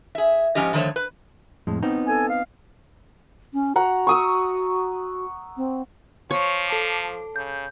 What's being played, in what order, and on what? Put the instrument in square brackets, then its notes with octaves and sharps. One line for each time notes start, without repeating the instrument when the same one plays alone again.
[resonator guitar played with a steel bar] G#4 E5
G#2 D#3 F3 C#4 G4 D#5
D3 D#3 F3 A3 C5 C#5
B4
[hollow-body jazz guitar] F2 A2 G#3
B3 C4 D#4
[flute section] A4 G#5
F5
[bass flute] C#4
[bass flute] F#4 [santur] F#5 A#5
[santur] C#6 D#6 E6
[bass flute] C4
[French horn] F3 [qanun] C#5
[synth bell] A4 A5 D6
[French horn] C#3 [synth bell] G6